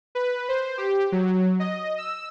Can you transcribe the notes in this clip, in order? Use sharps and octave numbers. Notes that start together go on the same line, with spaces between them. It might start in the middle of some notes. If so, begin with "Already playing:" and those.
B4
C5
G4
F#3
D#5
E6